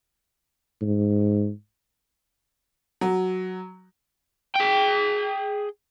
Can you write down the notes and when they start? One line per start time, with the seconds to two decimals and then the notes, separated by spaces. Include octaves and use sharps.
0.81 G#2
3.01 F#3
4.55 G#4 G5